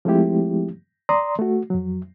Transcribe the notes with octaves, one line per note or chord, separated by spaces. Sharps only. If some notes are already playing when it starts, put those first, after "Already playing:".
F3 G#3 A3 C4 E4 G4
D5 A#5 C6 D#6
A3 F#4
F2 F#3